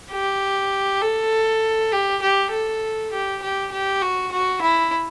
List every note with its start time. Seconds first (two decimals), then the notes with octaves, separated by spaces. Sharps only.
0.11 G4
1.01 A4
1.92 G4
2.22 G4
2.51 A4
3.12 G4
3.42 G4
3.71 G4
4.01 F#4
4.32 F#4
4.61 E4